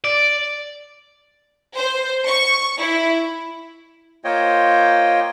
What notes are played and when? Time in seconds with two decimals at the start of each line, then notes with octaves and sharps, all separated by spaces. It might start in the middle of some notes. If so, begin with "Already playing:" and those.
0.04 D5
1.76 C5
2.26 C#6
2.79 E4
4.24 A#3 F4 C5 C#5 D#5 G5